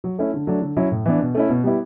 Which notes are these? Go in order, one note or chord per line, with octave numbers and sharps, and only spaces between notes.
F#3
A3 C#4 E4
D3
F#3 A3 D4
D3
F#3 C#4 E4
A2
E3 B3 D4
B2
A3 C#4 E4
B2
G3 B3 E4